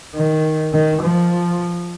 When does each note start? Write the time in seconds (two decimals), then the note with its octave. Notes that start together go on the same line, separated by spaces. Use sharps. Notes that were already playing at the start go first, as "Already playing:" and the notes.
0.15 D#3
0.73 D#3
1.02 F3